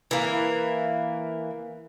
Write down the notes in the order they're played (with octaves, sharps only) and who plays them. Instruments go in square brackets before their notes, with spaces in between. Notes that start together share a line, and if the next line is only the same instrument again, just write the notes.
[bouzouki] E3 A#3